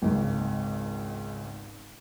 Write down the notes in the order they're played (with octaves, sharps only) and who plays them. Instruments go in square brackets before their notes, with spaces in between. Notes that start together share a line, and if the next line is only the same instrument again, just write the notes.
[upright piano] G#1 C#2 G#2